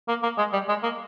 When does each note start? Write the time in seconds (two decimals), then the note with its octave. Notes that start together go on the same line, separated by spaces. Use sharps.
0.09 A#3
0.23 A#3
0.38 G#3
0.53 G3
0.69 G#3
0.83 A#3